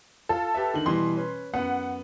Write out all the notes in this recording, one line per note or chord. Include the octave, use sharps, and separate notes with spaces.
F4 A4
G4 B4 E5
D3 D#3 F#7
B2 E3 G3 C6
C#4 B4
F#2 B3 F#5